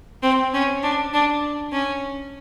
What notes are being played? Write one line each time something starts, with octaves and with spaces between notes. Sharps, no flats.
C4
C#4
D4
D4
C#4